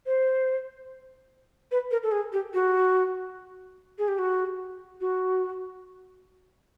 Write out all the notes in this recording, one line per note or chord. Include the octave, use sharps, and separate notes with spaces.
C5
B4
A#4
A4
G#4
G4
F#4
G#4
G4
F#4
F#4